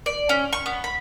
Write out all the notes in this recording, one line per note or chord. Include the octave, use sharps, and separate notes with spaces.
D5
C#4
C#6
B3
B5